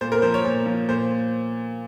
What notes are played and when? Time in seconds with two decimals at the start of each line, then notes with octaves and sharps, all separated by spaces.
0.01 A#2 C5
0.12 A#4
0.22 F3 C5
0.34 C#5
0.44 A#2
0.66 F3
0.88 A#2 C5